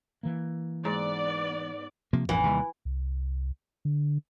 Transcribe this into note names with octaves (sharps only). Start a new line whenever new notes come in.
E3 A#3
G#2 B3 D5
C3 F3 A#3
A1 F2 G#2 E3
D#2 C3 G3
C2
D3